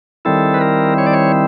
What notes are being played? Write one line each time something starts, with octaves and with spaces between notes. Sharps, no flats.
D#3 G3 C4 E4 A4
B4
A#4
C#5
D5
C#5